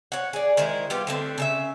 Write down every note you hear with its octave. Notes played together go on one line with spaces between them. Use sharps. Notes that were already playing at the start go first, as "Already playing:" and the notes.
C#5 F#5
G#4 D5
D#3 G#3 E4 C5
G3 B3 F4 G4
D3 A3 C4
C#3 A4 E5